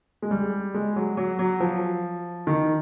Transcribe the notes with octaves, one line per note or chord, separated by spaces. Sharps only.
G#3
G3
G#3
F#3
F#3
F#3
F3
D#3